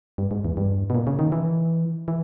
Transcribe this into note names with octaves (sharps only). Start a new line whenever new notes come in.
G2
G#2
E2
G2
B2
A#2
C#3
D#3
E3
E3